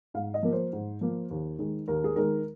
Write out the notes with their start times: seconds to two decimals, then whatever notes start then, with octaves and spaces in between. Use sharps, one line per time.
0.14 G#2 F5
0.34 D#5
0.43 F3 A#3 A#4
0.52 C5
0.73 G#2
1.01 F3 A#3
1.30 D#2
1.59 D#3 G#3
1.88 D#2 A#4
2.04 G#4
2.16 D#3 G#3 A#4